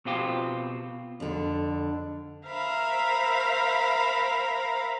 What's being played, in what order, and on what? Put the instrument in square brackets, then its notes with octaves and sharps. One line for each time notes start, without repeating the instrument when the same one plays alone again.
[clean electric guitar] B2 C4 F4 G4
[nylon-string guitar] F2 D3
[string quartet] A#4 C5 E5 F5 A#5 B5